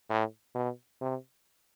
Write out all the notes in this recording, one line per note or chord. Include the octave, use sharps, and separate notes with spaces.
A2
B2
C3